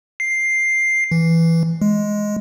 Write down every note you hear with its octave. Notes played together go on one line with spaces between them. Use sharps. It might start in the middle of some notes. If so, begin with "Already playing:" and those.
C7
E3
G#3